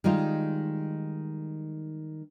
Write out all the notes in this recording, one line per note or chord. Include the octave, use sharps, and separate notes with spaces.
D#3 G3 G#3 D#4 F4